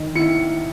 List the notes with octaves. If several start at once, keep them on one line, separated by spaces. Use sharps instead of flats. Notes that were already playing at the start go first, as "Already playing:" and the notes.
Already playing: D#3
E4 C#7